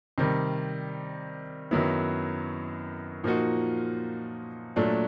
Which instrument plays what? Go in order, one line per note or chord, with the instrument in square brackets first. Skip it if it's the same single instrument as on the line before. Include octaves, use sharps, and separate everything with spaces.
[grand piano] C3 D#3 G3
F#2 D#3 F#3 B3 E4
A#2 F3 A#3 D#4 F#4
A#2 F#3 A3 D4